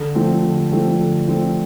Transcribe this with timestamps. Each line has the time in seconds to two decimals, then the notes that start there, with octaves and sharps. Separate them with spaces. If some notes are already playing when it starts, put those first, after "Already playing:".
Already playing: D3
0.15 F3 A3 C4
0.43 D3
0.72 F3 A3 C4
1.00 D3
1.28 F3 A3 C4